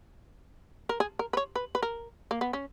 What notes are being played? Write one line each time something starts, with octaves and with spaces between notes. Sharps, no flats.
A#4
G#4
A#4
B4
C#5
B4
B4
A#4
A#3
B3
C#4